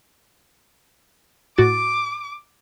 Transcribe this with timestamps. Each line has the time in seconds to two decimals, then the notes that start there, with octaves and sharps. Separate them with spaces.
1.58 A2 F#4 D6 A6